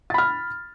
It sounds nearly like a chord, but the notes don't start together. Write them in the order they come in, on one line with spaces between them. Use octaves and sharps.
A6 B5 F6